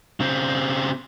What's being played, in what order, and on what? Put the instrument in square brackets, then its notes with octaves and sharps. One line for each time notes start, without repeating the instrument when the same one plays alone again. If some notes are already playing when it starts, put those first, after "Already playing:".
[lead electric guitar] C#3 C4